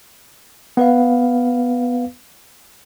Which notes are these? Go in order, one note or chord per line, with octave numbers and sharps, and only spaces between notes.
B3 B4 F5